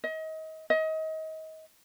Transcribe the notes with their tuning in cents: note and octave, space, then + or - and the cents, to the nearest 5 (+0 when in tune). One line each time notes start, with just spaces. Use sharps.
D#5 +30
D#5 +30